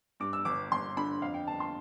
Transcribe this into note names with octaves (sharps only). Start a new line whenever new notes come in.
G2 D6
E6
G1 D6
G1 C6
D3 B5
F2 F5
G5
G1 A5
C6